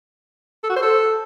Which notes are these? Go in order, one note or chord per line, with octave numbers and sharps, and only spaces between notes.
A4
F#4
C5
A4